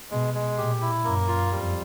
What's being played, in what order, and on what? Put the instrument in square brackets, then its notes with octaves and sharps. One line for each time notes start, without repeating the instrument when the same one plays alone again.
[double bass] B2 [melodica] G#3
[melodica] G#3
[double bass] A#2 [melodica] G4
[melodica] E4
[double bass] F#2 [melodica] A#3
[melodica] F4
[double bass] F2 [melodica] G3